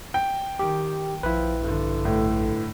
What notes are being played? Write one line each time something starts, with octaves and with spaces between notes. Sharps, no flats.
G5
D#3 G4
A#1 F3 E4 B4
G2 D3
A2